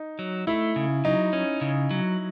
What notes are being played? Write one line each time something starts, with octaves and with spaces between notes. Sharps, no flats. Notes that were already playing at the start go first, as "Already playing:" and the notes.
Already playing: D#4
F#3
A3 E4
C#3
F#3 D#4
C#4
C#3
F#3